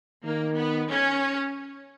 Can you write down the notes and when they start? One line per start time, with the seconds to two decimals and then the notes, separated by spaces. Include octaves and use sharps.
0.24 D#3 A#3
0.56 B3
0.89 C#4